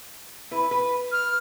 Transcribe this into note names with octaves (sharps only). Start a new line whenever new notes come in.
E4 B4
B4
F6